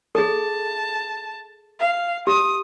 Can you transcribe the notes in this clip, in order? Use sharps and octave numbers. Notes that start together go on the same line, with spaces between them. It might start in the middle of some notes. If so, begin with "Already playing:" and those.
G#4 A4 A5
F5
G4 D#6